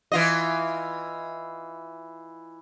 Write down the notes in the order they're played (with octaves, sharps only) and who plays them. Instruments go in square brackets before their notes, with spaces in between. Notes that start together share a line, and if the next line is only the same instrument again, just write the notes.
[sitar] E3 F4 D#5